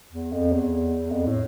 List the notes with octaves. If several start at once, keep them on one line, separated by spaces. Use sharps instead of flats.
E2
F2
E2
F2
A2